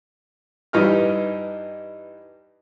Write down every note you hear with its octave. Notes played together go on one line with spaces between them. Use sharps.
G2 E3 D#4 G4 F6